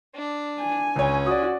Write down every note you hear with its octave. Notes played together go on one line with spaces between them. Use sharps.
D4
G#5
C#2 C#4 C#5
F#4 D5 D#6